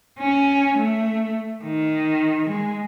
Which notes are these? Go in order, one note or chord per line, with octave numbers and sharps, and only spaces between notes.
C#4
A3
D#3
G#3